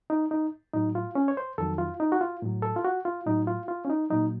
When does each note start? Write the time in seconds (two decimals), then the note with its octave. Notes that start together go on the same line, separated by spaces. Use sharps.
0.10 D#4
0.31 D#4
0.74 A2 F#3 D#4
0.95 F4
1.15 C#4
1.28 C#5
1.37 C5
1.58 F2 D#3 F#3 A4
1.78 F4
2.00 D#4
2.12 F#4
2.21 F4
2.42 A2 F#3
2.62 A4
2.76 F4
2.84 F#4
3.05 F4
3.26 A2 F#3 D#4
3.47 F4
3.68 F4
3.85 C#4
3.90 D#4
4.10 A#2 F#3 D#4